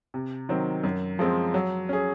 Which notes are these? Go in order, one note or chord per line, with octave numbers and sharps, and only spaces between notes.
C3
D#3 F#3 C4
F#2
F3 G#3 C4
F#3
C#4 G#4